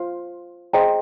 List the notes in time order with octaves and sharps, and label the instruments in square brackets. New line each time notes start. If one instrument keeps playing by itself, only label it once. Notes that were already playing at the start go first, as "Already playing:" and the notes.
Already playing: [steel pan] F4 C5 F5
G#4 C5 D#5 G5 A#5